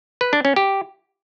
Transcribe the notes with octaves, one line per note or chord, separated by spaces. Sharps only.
B4
D4
C#4
G4